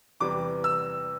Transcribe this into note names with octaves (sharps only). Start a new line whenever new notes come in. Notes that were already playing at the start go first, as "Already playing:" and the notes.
E2 C3 E3 G3 D6
E6